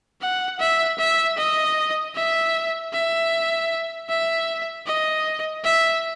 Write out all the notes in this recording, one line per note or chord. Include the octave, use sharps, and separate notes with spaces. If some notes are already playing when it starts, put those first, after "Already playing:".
F#5
E5
E5
D#5
E5
E5
E5
D#5
E5